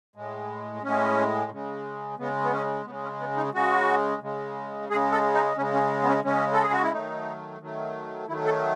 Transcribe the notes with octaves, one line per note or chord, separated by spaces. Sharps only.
A2 G#3
A2 G#3 C#4
C#3 G#3
C#3 G#3 B3
B3
C#4
C#3 G#3 B3
C#4
B3
D#4
C#3 G#3 F#4
C#3 G#3
C#3 G#3 G#4
A4
D#4
C#3 G#3 C#4
C#4
B3
C#4
C#3 G#3 C#4
A4
G#4
F#4
E4
D#3 F#3 A3 D#4
D#3 F#3 A3
D#3 F#3 A3 E4
A4